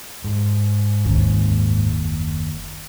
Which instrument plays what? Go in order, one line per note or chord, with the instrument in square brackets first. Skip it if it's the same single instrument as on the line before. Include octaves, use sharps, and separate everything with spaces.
[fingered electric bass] G#2
[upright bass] F#1 D#2